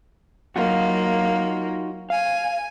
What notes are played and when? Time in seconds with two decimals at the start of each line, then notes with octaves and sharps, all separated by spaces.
0.56 F#3 A#3 D#4 F4 F#4
2.10 F5 G#5